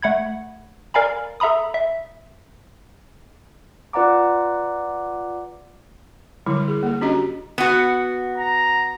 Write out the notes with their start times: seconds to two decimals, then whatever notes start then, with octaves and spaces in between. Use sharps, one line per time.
0.02 A3 F#5 B5 G#6
0.94 A#4 D5 F5 G#5 A#5 B5
1.40 A4 E5 A#5 B5 D#6
1.74 E5
3.93 F4 B4 D5 F#5 A#5 D6
6.46 D3 F#3 G3 E4
6.68 G#4
6.83 A#3 A4
7.01 C#4 D4 F#4 G4 D#5 A#5
7.58 B3 F#4
8.38 A#5